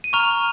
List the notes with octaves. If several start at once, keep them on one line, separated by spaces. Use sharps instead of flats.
D#7
A#5 C#6 F6 F7